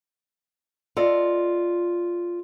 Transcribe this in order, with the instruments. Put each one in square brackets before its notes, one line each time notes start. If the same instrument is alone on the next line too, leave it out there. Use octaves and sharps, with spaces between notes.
[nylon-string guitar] F4 A4 D5 D#5